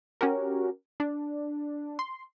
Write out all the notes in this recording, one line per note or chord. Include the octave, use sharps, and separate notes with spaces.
C#4 F#4 G4 A#4
D4
C6